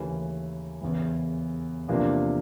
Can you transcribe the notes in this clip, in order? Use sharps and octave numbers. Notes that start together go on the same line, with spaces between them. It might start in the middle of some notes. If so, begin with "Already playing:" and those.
Already playing: D#2 C#3 E3 A3 C#4
E2 C#3 E3
E2 C3 F3 A#3 D4